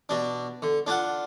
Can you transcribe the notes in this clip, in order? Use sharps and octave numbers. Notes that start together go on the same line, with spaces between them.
B2 D4
D3
D4 F4 F#5